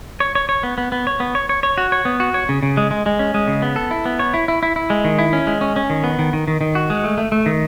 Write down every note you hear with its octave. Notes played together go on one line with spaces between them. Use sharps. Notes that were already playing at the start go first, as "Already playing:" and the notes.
C#5
C#5
C#5
B3
B3
B3
C#5
B3
C#5
C#5
C#5
F#4
C#5
B3
F#4
C#5
C#3
C#3
G#3
G#3
G#3
C#4
G#3
C#3
B3
A4
E4
B3
C#5
E4
E4
E4
E4
G#3
D#3
E4
C#4
G#3
C#4
C#4
D#3
B3
D#3
D#3
D#3
D#3
F#4
G#3
A3
A3
A3
D#3